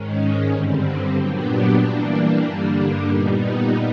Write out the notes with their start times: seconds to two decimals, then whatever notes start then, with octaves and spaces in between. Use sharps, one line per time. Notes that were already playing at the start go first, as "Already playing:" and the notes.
Already playing: G#2 D#3 G#3 C#4
0.50 G2 D3 G3 C4
1.15 A#2 F#3 B3 D4 G4
1.78 E3 G3 A#3 D4
2.43 G2 D3 G3 A#3 D4
3.07 A#2 G3 B3 D#4